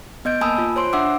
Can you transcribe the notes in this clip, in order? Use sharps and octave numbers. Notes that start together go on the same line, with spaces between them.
B3 D#5 G6 D7
A#3 G#5 A5 B5 D#6 E6
F4
C5 C#5 C6 D7
D4 E5 F#5 D6 E6